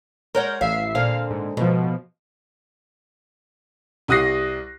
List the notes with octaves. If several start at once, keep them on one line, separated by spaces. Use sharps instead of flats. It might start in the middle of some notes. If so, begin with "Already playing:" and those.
G#3 A#4 C#5 F#5 G6
A1 E5 F5 C7
A#2 D3 C4 F5
G#2
G#2 B2 F3
C2 G4 D#6 F#6 A#6 C7